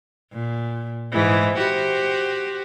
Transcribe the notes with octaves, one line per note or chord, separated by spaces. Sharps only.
A#2
G#2 E3
F#4 G4 C5